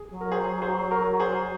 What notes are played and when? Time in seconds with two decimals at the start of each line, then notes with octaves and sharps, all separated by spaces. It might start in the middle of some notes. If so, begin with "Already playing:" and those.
Already playing: G#4
0.10 F#3
0.21 A#4
0.32 G#4 C5
0.62 G#4 C5
0.91 A#4
1.20 G#4 C5